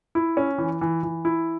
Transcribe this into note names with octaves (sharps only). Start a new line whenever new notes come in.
E4
C#4
E3
E3
E3
E4